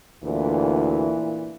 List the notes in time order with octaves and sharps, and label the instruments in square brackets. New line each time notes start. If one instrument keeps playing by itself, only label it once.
[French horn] D2 [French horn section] A#2 E3